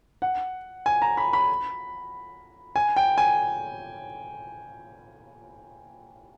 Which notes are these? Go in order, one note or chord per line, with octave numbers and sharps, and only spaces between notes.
F#5
G#5
A#5
B5
B5
G#5
G5
G#5